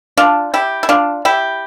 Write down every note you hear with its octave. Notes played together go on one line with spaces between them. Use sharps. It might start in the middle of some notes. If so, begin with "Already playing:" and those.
D4 F4
E4 G4
E4
D4 F4
E4 G4